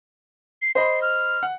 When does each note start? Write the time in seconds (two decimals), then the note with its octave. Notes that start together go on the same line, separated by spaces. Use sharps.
0.62 C7
0.75 C5 D#5 B5 C7
1.02 F6
1.43 F#5